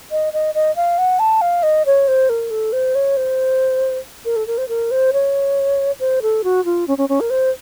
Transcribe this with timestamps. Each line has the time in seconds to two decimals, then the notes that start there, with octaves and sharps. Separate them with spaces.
0.11 D#5
0.33 D#5
0.55 D#5
0.76 F5
0.98 F#5
1.19 A5
1.41 F5
1.63 D#5
1.86 C#5
2.08 C5
2.29 A#4
2.51 A4
2.73 C5
2.95 C#5
3.17 C5
4.25 A#4
4.36 A4
4.47 A#4
4.58 C5
4.69 A#4
4.91 C5
5.13 C#5
6.00 C5
6.22 A4
6.44 F#4
6.65 F4
6.88 C#4
6.98 C#4
7.09 C#4
7.20 A#4
7.30 C5